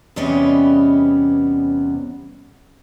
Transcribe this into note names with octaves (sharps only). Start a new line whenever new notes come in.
E2 C3 G3 B3 C#4 D#5